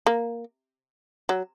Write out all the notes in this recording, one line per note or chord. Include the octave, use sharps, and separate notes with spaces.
A#3
F#3